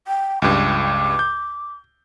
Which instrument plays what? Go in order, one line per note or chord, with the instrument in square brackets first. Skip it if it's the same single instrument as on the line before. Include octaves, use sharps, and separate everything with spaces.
[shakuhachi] G5
[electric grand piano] C#2 G2 [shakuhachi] D6
[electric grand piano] G6